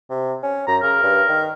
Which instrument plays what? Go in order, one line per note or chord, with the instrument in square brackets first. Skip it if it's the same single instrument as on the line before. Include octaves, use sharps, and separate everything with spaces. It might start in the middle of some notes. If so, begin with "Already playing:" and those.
[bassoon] C3
C#4
[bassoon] F#2 [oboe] A#5
[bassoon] C#3 [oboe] A#4
[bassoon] G2
D#3